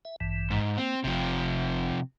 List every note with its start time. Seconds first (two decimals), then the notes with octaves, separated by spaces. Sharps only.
0.05 E5
0.20 A1 G2 E3
0.50 G#2
0.78 A#3 C4
1.04 F#1 C3 F3